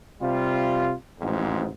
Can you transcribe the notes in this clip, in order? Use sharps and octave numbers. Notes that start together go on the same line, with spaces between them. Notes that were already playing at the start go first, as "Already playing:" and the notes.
C3 G3 F4
A1 F2 G#2